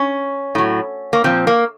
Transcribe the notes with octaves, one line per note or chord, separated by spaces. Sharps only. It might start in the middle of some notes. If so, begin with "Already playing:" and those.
Already playing: C#4
A2 F#3
A#3
A#2 F3 C4
A#3